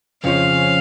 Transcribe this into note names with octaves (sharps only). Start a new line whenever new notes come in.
F2 C#3 F3 C#4 F5